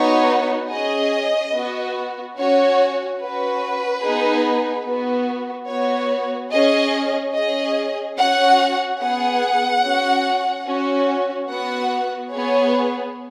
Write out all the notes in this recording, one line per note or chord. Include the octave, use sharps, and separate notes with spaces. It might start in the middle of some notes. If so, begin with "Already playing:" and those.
Already playing: B3 D#4 F#4 C#5
C#4 G#4 D#5
B3 F#4
C#4 F#4 C#5
C#4 F#4 B4
B3 D#4 G#4
B3 F#4
B3 F#4 C#5
C#4 G#4 D#5
C#4 G#4 D#5
C#4 F#4 F#5
B3 G#4 F#5
C#4 F#4
C#4 F#4
B3 F#4 F#5
B3 G#4 C#5